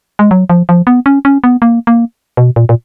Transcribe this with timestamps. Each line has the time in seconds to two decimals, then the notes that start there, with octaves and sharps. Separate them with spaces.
0.19 G#3
0.31 F#3
0.50 F3
0.69 F3
0.87 B3
1.06 C#4
1.25 C#4
1.44 B3
1.62 A#3
1.87 A#3
2.37 B2
2.56 A#2
2.69 A#2